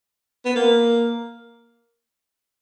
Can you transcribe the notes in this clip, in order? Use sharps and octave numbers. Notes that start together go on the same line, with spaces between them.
B3
A#3